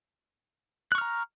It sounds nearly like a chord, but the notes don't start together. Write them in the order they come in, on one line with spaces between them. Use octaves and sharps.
F#6 C#6 F6 A#5